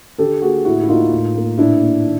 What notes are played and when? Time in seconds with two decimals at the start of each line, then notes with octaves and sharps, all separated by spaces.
0.18 D3 G4 A4
0.42 A#3 F#4 G#4
0.65 A2 E4 F#4
0.83 E4
0.88 A#3 D#4 F4
1.12 A2
1.35 A#3
1.58 A#2 D4 E4
1.81 A#3
2.05 D#3